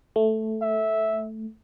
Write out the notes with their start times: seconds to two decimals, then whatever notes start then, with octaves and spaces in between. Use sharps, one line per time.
0.16 A3
0.62 E5